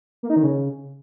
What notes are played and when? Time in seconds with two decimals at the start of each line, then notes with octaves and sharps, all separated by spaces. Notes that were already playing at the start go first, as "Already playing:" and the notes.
0.23 A#3
0.30 D#4
0.36 D#3
0.43 C#3